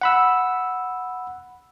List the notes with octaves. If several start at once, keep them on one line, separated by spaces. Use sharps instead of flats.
F#5 B5 E6